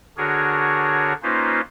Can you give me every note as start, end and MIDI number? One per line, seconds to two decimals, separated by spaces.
0.17 1.13 50
0.17 1.13 62
0.17 1.13 66
0.17 1.13 68
0.17 1.13 70
0.17 1.13 73
1.23 1.61 58
1.23 1.61 61
1.23 1.61 63
1.23 1.61 65
1.23 1.61 71
1.23 1.61 72